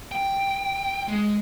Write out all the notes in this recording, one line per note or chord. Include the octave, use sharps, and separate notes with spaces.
G5
G#3